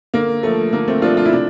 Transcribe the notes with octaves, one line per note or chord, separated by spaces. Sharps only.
D3 A#3
F3 A3
D3 A#3
A3 C4
F3 A3 D4 F4
F4
E4
C3 D4